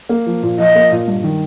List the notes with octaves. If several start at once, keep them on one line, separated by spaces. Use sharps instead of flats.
A#3
F3
A#2
F3 D#5
A#3
A#2
G2
D#3